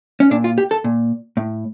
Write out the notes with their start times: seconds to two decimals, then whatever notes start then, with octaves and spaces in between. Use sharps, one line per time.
0.20 C#4
0.31 A#2 D4
0.44 F4
0.58 G4
0.71 A4
0.84 A#2
1.37 A2